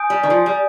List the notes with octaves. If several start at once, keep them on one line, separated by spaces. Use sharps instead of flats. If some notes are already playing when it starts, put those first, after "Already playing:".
Already playing: G#5 D#6 G6 D7
G3
D#3
F3
G3